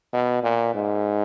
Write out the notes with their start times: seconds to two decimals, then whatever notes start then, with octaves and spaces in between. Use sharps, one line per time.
0.13 B2
0.43 A#2
0.74 G#2